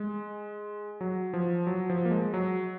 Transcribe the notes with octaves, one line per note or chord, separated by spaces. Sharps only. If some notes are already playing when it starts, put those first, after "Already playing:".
Already playing: G#3
F#3
F3
F#3
F3
A#3
G#3
F#3